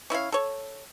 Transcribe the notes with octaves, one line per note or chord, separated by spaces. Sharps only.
C#4 E4 C#5 F5
A4 C#5